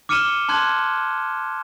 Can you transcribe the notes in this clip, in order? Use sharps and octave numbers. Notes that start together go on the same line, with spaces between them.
D6 F6 C#7 D#7 E7 G7
A5 C6 F#6 G#6